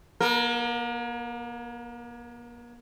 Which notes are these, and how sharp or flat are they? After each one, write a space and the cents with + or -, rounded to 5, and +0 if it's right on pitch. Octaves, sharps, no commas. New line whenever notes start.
A#3 +45 A#4 -10